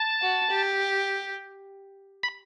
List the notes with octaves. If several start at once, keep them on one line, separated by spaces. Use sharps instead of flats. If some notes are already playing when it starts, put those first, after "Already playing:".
Already playing: A5
F#4
G4
B5